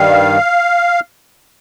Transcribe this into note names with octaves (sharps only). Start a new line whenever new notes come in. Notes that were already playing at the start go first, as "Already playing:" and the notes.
Already playing: G2 D#3 G3 F5